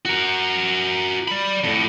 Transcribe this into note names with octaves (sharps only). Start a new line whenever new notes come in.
F#4 A#4
D5 B5
F2 A2